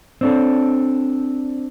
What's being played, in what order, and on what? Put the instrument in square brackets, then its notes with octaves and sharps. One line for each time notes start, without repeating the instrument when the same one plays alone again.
[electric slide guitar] C4 D4 A4